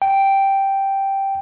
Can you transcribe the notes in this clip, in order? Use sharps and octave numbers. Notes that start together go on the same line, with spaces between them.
G5